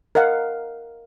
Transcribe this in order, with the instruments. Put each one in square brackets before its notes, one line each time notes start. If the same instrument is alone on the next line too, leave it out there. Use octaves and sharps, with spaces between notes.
[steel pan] A#4 D#5 F5 F#5